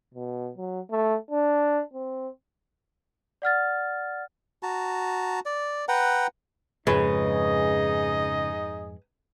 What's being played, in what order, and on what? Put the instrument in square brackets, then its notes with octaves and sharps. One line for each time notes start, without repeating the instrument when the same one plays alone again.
[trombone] B2
F#3
A3
D4
C4
[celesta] D5 F#5 F6 A6
[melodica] F#4 A5 A#5
D5
B4 F#5 G5 A#5
[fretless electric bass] F2 G#2 G#3 [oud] C#3 [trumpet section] D#4 G#4 D#5 [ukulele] B4